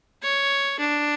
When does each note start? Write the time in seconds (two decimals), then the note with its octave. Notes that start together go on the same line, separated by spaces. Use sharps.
0.23 C#5
0.80 D4